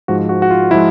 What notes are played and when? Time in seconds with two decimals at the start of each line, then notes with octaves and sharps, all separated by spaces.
0.08 G#2 F3 G#3 F#4
0.29 F#4
0.42 F#4
0.51 F4
0.71 F3 G#3 E4